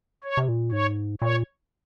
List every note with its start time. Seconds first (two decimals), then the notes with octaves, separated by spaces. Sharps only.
0.24 C#5
0.37 C3
0.49 A#2
0.72 G#2 C#5
1.22 A#2 C#5